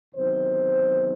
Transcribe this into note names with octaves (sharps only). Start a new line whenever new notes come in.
E2 C3 D#3 F#3 C5